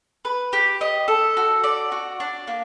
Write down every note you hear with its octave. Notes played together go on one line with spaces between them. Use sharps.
B4
G4
D#5
A4
F#4
D5
F#4
D4
A#3